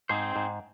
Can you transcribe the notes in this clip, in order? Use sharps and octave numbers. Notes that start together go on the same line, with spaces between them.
G#2 C4 D#4 G#4 C5
G#2